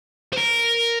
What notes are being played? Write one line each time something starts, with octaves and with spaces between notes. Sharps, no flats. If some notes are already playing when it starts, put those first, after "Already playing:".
C5
A#4